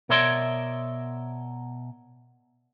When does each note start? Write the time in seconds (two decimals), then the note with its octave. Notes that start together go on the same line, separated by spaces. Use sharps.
0.09 B2 A#4 C#5 D5 E5 C6